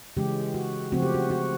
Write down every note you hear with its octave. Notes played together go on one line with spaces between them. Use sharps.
C#3 E3 G#3 C#4 G4
F#4
C#3 F3 A3 C4 F#4
G4
F#4
F#4